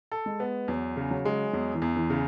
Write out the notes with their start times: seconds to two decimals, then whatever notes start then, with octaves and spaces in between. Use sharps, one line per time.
0.12 A4
0.26 G#3
0.40 B3
0.68 E2 F#3
0.97 C#3
1.11 F#3
1.25 G#3
1.53 E2 F#3
1.75 E3
1.82 E2
1.96 E3
2.10 C#3